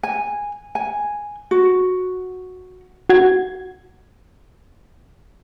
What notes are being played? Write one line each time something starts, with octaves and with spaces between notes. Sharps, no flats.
G#5
G#5
F#4
F#4 G#6